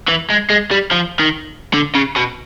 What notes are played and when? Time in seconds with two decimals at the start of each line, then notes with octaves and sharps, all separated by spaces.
0.08 E3
0.30 G#3
0.50 G#3
0.71 G3
0.91 F3
1.19 D#3
1.74 D3
1.95 C#3
2.16 B2